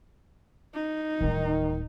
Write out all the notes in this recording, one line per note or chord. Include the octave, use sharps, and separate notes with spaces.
D#4
D1 D#3 G3